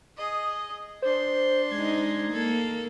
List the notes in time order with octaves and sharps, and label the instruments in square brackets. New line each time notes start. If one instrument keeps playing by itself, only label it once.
[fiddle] G#4 D#5
[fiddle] D4 C6 [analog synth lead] C5
[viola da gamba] G#3 D#4 [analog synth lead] G#6
[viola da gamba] A#3 [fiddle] A4